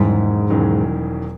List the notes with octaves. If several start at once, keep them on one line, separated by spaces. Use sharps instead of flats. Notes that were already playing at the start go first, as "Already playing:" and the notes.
Already playing: E1 E2 G#2 D#3 F#3 C#4
E1 E2 D#3 F#3 C#4